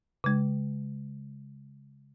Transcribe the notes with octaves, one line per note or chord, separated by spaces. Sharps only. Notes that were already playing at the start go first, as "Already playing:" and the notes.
C#3 G#3